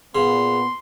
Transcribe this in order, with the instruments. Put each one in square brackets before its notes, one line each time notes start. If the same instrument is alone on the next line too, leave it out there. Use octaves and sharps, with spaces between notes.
[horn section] A#2 B3 [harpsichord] C#3 [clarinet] C6